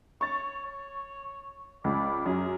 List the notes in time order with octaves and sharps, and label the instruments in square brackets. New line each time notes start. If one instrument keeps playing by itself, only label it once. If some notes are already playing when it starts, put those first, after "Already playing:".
[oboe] C#5 [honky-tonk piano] C#6 A6
[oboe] C#5
[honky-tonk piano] C#2 [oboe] D5
[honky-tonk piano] F#2 [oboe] G#4